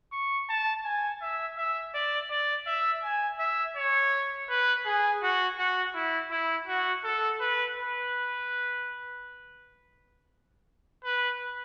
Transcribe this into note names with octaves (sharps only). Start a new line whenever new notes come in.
C#6
A5
G#5
E5
E5
D5
D5
E5
G#5
E5
C#5
B4
G#4
F#4
F#4
E4
E4
F#4
A4
B4
B4
B4